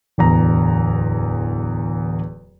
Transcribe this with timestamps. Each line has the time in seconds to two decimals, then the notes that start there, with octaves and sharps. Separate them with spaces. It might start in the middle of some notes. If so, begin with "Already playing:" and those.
0.18 D1 E2 A#5